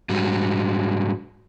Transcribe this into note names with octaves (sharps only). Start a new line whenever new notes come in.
G#2 F#3 G3